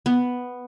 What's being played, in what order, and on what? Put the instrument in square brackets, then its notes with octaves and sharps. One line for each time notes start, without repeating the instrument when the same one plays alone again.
[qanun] B3